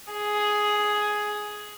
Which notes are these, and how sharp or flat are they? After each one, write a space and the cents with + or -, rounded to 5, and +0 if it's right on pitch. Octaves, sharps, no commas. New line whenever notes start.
G#4 +5